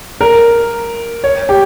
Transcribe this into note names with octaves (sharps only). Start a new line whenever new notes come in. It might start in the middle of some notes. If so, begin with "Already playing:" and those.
A#4
C#5
G4